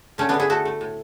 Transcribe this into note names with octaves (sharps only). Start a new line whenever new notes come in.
D3 A3 C#4
D3 B3 D4
E4 G#4
A3 F#4 A4
A3
A2